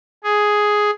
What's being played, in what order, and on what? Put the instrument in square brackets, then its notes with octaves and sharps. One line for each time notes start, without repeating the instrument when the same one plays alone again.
[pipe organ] G#4